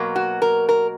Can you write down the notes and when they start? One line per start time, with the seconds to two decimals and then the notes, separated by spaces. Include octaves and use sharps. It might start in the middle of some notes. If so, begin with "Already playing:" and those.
Already playing: B2 F#3 A#3
0.16 F#4
0.42 A#4
0.69 A#4